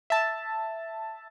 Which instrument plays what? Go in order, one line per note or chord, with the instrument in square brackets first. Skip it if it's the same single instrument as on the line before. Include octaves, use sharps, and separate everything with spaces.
[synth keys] E5 A5